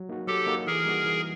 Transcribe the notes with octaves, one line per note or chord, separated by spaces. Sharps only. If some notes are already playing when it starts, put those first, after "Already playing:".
Already playing: F#3
A#3 D#4 F#4
F#3 G4 A4
A#3 D#4 F#4
E3 G#4 A#4
G3 A#3 D#4 F#4
E3